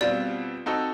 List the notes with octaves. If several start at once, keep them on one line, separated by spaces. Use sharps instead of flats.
B2 G3 C4 F4 D5
C4 D#4 F#4 A4